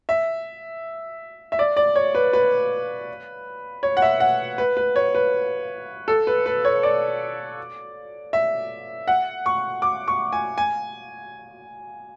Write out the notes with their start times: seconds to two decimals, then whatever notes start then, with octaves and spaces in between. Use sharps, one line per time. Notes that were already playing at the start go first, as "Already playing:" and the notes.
0.09 E5
1.52 E5
1.59 D5
1.77 D5
1.96 C#5
2.15 B4
2.33 B4
3.83 C#5
3.97 F#5
4.02 E5
4.20 F#5
4.58 B4
4.77 B4
4.96 C#5
5.15 B4
6.08 A4
6.27 B4
6.46 B4
6.65 C#5
6.83 D5
8.33 E5
9.08 F#5
9.46 C#6
9.82 D6
10.08 C#6
10.33 G#5
10.58 G#5